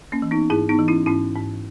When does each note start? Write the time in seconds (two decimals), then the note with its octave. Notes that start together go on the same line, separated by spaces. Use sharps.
0.12 A#3 C#4
0.22 E3
0.31 B3 D#4
0.50 G#2 E4 G#4
0.69 B3 D#4
0.79 E3
0.88 C#4 E4
1.06 G#2 C#4 E4
1.36 G#2